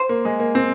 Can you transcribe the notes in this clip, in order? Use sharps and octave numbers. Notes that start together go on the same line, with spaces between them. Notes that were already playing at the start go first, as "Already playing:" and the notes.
Already playing: C5
A#3
G#3
A#3
C4